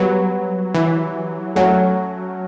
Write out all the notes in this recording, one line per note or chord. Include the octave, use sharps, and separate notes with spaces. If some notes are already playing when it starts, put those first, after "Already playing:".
Already playing: F#3 G3 B3 F#4 B4
E3
F#3 A3 C#4 F#4 C#5